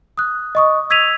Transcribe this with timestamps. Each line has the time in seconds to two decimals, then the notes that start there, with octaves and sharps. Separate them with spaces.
0.18 D#6 F#6
0.55 D#5 C#6 D#6
0.90 E6 G#6 B6 D#7 F7